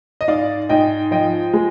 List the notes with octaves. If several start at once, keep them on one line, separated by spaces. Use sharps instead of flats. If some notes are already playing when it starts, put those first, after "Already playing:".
D#5
G#2 D5 F5
G#2 D#5 G5
F3 D#5 G5
G#3